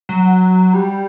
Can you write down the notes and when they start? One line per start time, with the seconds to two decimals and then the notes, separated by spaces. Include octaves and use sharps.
0.09 F#3
0.73 G3